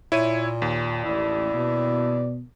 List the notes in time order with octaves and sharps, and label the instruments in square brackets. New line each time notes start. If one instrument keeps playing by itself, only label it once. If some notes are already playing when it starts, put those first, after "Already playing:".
[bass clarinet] A#2 [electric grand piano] E4 C#5 D#7
[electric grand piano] D#2
[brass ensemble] A1 [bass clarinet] E4 [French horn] D5
[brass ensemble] B2